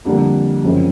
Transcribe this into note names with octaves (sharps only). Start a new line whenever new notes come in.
F2 D3 G3 A#3 D4
F#2 C#3 F3 G#3 C4